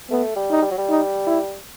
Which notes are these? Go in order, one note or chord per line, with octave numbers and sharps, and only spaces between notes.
A3 B3
G3
D#4
G3
F#3
G3
D#4
E4